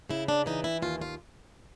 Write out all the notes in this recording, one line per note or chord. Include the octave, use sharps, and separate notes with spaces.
C#3 E4
D4
E3 D#4
E4
D#2 F4
F4